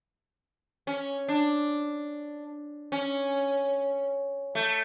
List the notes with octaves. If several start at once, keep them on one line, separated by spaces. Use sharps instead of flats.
C#4
D4
C#4
A3